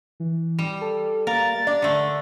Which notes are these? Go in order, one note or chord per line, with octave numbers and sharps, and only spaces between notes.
E3
G3
A4
A#3 A#4 A6
D4 D5
D3 A3